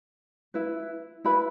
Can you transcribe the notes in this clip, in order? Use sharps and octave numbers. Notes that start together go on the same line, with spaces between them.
E4 B4
E4 B4 B5